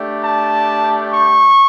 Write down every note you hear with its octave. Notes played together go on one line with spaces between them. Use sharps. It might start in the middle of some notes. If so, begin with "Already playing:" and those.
Already playing: A3 D4 G4
A5
C#6